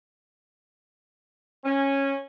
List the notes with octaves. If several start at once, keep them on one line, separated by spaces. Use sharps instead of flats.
C#4